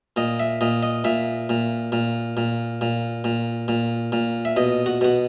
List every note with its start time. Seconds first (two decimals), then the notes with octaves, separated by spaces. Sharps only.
0.16 A#2 D#5
0.40 E5
0.61 A#2 D#5
0.83 D#5
1.04 A#2 E5
1.49 A#2
1.92 A#2
2.37 A#2
2.81 A#2
3.24 A#2
3.68 A#2
4.12 A#2
4.45 E5
4.56 B2 D#5
4.86 F#4
5.01 B2 F#4